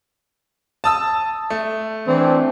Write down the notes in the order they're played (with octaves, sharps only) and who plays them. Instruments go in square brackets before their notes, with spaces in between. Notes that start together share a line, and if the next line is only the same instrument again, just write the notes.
[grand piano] A5 D#6 E6
A3
[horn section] E3 C4 D4